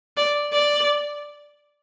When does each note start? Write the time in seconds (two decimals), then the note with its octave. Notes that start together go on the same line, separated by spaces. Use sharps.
0.17 D5
0.52 D5